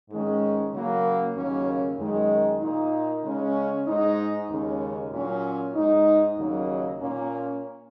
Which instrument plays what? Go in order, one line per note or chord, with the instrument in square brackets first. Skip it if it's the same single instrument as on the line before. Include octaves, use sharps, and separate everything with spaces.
[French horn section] G#2 D#3 G#3 C#4
C#3 F#3 A#3
D#2 C#3 F#3 A#3 C#4
F#2 D#3 G#3
A#2 A#3 D#4
C#3 G#3 C#4
G#2 G#3 D#4
D#2 C#3 G#3 C#4
A#2 F#3 C#4
G#2 G#3 D#4
D#2 C#3 F#3 A#3 D#4
A#2 A#3 C#4